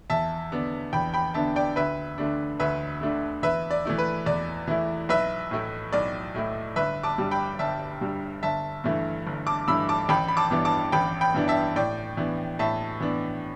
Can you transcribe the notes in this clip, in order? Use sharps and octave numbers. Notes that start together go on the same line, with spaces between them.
E2 E5 A5
D3 B3 D4
E2 G5 B5
G5 B5
D3 B3 D4 E5 A5
D5 G5
D2 B4 E5
D3 A3 D4
D2 B4 E5
D3 A3 D4
E2 B4 E5
D5
E3 A3 E4
B4
E2 D5
E3 A3 E4
B1 B4 E5
A2 A3 E4
B1 D5
A2 A3 E4
G1 B4 E5
A5 D6
G2 G3
G5 B5
G1 E5 A5
G2 G3
G1 E5 A5
G2 E3 A3
G1
A5 D6
G2 E3 A3 B5 E6
A5 D6
A1 G5 B5
B5
A5 D6
G2 E3 B3 D4
A5 D6
A1 G5 B5
G5 B5
G2 E3 B3 D4
E5 A5
A2 D5 G5
E3 B3 D4
A2 E5 A5
E3 B3 D4